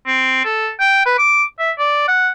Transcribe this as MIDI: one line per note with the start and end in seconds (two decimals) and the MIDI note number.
0.06 0.40 60
0.45 0.69 69
0.79 1.04 79
1.06 1.18 71
1.18 1.44 86
1.59 1.71 76
1.79 2.04 74
2.08 2.30 78